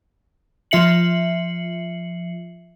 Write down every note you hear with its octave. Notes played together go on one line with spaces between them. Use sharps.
F3 F4 E5 C7 C#7 F#7